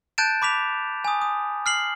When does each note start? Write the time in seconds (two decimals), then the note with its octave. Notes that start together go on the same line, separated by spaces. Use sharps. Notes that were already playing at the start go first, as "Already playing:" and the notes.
0.18 A5 F#6 G6 A6 D7 E7
0.42 B5 D6 B6 F7
1.04 G#5 D#6
1.22 D#6
1.66 F6 C7 F#7